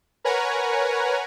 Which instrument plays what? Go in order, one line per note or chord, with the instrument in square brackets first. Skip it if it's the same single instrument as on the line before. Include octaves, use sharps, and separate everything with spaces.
[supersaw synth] A#4 B4 C#5 F#5 G#5 A#5